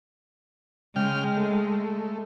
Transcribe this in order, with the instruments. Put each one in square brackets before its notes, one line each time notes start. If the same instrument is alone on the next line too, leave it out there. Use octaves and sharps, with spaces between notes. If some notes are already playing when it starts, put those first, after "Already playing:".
[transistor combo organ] C#3 G5 F6 [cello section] G#3
[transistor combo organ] A3